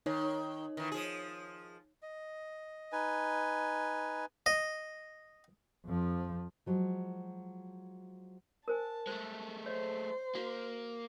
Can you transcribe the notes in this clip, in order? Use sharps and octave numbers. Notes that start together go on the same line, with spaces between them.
D#3 D#4 C#5
D#3 E3
F3 G#4
D#5
D#4 B4 G#5
D#5
F2 F3
F3 F#3 G#3
A#4 C5 G#5 A5
G#3 A3 C5
C5 C#5 D#5
A#3 F#4 F5